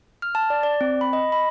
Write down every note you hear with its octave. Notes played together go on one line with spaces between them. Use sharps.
F6
A5
D5
D5
C4
B5
D#5
B5